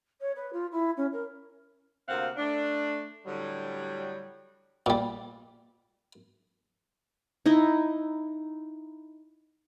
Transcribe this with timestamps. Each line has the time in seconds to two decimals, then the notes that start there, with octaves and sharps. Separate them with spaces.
0.20 C#5
0.35 B4
0.52 F4
0.71 E4
0.97 C#4
1.12 A#4
2.08 D2 C3 A#3 C4 F5 F#5
2.37 A3 D4
3.25 A2 D3 F#3 G3
4.86 A#2 G3
7.46 D#4 E4 D#5